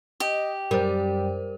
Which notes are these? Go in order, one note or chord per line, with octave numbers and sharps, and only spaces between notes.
G4 D#5
F#2 G3 A#4 C5